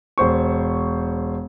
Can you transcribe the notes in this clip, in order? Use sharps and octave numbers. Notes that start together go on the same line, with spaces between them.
E1 C5 C#6